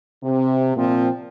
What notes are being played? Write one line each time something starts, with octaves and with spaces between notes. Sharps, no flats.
C3
A#2 F3 C4